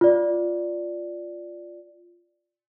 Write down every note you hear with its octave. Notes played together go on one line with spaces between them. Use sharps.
F4 D5